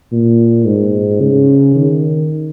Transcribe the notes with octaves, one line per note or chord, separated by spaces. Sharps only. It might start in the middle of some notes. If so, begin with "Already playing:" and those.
A#2
G#2
C#3
D#3